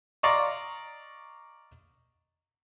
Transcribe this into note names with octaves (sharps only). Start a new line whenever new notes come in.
D5 D#5 F5 A#5 C6 C#6